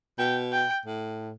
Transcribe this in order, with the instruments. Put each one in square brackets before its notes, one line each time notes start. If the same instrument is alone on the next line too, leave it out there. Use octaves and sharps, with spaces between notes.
[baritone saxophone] B2 [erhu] G5
[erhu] G5
[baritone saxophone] A2